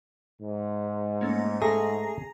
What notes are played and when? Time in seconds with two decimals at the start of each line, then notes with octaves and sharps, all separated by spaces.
0.41 G#2
1.21 A3 A#3 C#4
1.62 A3 G#4 A#5 A#6